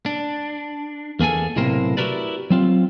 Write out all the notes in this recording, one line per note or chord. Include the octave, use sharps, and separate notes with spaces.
D4
E2 A#3 G#4 A4 G#5
B1 A2 C3 A#3 A#4 C5
E4 F#4 G4 A#4 B4 D5
F#3 C4 F4